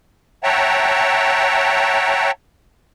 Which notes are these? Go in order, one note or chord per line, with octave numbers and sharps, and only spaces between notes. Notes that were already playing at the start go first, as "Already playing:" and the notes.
C#5 E5 F#5 G5 A5 A#5